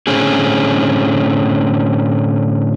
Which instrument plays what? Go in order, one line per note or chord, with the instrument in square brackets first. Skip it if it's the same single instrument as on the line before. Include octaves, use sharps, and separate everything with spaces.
[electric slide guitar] A2 D3 C4 C#4 G#4